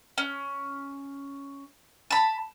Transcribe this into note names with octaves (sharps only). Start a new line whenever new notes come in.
C#4
A5 B5